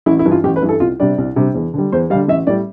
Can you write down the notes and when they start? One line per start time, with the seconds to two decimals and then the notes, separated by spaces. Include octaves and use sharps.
0.06 A1 E4
0.19 E4
0.25 G2 E3
0.31 F4
0.44 A1 G4
0.56 B4
0.62 G2 E3
0.69 A4
0.80 C2 F4
1.00 C3 G3 D4 D5
1.18 C2
1.36 C3 G3 D4
1.54 E2
1.74 D3 G3
1.92 E2 C5
2.10 G3 F5
2.14 D3
2.28 A1 E5
2.47 A2 G3 D5